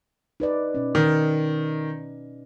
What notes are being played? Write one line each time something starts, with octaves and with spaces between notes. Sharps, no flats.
D#4 B4 D5
B2 C#4
D#3